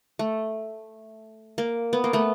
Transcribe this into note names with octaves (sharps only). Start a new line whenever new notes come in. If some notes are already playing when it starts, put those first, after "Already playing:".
A3
A#3
B3
A#3
A3 B3